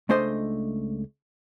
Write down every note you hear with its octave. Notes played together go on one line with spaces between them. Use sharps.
C#2 A3 D4 C5 D#5 C6